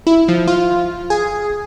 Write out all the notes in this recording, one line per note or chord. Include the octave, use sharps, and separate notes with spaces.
E4
F3
F4
G#4